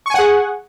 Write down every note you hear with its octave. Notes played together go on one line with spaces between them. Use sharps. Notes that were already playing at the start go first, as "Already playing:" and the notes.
G#4 F#5 G#5 C#6